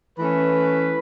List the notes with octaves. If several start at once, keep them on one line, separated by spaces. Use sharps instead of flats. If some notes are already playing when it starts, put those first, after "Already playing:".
E3 A3 C#4 B4